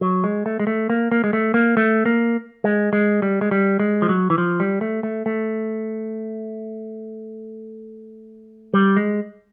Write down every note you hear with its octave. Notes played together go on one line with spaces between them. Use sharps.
F#3
G#3
A3
G#3
A3
A#3
A#3
G#3
A3
A#3
A3
A#3
G#3
G#3
G3
G#3
G3
G#3
F3
F#3
E3
F3
G3
A3
A3
A3
G3
G#3